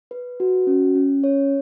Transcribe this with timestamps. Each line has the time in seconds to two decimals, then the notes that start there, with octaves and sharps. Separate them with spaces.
0.11 B4
0.40 F#4
0.67 C#4
0.95 C#4
1.24 C#5